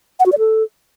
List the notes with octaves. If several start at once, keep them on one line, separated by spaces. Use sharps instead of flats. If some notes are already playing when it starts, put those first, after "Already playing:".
F#5
F#4
D5
A4